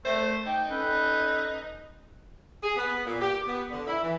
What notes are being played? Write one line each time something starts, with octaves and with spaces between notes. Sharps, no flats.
A3 C5
D#4 G5
C#4 A4 B4
G#4
B3
A#2
G4
B3
D3
E4
E3